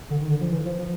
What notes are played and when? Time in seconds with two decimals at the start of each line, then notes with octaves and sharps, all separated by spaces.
0.10 D3
0.21 D#3
0.30 D3
0.41 F3
0.51 E3
0.65 F3
0.78 F3